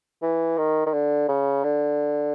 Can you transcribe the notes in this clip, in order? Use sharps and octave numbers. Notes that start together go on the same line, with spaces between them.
E3
D#3
D#3
D3
C#3
D3